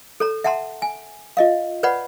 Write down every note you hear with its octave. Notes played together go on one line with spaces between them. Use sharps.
A4 C#5 A#5
E5 F#5 A5 A#5 C6
G#5
F4 D#5 F5
B4 C#5 D5 F#5 B5